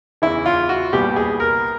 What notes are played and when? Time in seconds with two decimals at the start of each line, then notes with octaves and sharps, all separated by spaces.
0.22 E2 C#3 E3 E4
0.46 F4
0.69 F#4
0.93 C2 A#2 G3 B3 G4
1.16 G#4
1.40 A#4